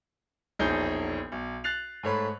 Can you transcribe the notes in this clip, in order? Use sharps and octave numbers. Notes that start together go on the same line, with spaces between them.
E1 A#1 D#4 G#4 C#5 G6
B1
F#6 A6 C7 F7
G#2 A3 C#5 B5